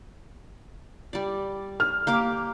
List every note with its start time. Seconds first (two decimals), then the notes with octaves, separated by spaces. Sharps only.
1.13 G3 D5
1.80 F6
2.07 A#3 G4 D6